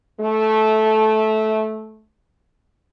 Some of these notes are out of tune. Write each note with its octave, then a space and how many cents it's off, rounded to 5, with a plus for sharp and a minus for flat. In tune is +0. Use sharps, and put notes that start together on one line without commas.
A3 -15